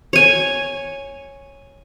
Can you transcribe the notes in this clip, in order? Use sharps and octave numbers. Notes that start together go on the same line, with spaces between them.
C#5 G#5